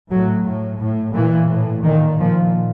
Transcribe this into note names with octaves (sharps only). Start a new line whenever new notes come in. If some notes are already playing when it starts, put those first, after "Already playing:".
A2 F#3
A2
A2
A#2 E3
A2
A#2 D#3
A#2 F3